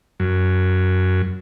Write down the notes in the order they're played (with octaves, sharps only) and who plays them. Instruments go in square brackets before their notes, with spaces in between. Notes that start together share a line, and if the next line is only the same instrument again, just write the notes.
[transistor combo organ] F#2